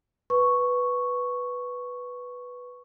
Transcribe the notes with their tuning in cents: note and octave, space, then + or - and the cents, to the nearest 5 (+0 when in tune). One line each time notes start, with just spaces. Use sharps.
B4 +0 C#6 +0